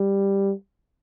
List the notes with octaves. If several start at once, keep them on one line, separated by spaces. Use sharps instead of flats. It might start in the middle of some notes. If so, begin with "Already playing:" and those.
Already playing: G3